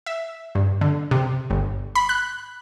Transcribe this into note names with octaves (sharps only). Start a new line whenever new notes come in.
E5
G2
D3
C3
G1
B5
F#6